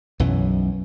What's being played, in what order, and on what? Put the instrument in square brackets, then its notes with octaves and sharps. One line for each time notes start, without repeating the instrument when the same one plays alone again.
[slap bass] B1 F#2 E3